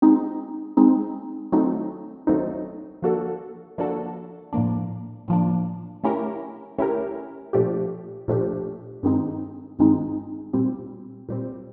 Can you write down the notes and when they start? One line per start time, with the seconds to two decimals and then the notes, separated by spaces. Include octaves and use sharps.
0.02 G#3 C4 D#4
0.77 G#3 C4 D#4
1.52 D#3 F#3 A3 C4 D#4
2.27 D#3 F#3 A3 C4 D#4
3.02 F3 A#3 D4 F#4 A4
3.78 F3 A#3 D4 F#4 A4
4.53 A2 F3 A#3 D4
5.28 A2 F3 A#3 D4
6.04 A3 C#4 E4 G4 A#4
6.78 A3 C#4 E4 G4 A#4
7.53 A#2 F3 A3 D4 G4
8.28 A#2 F3 A3 D4 G4
9.03 G2 D#3 G#3 C4 D#4
9.79 G2 D#3 G#3 C4 D#4
10.54 A#2 G3 C4
11.29 A#2 G3 C4